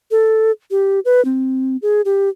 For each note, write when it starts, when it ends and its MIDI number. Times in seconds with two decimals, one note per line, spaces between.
0.11 0.51 69
0.71 1.00 67
1.05 1.23 71
1.25 1.77 60
1.82 2.01 68
2.05 2.29 67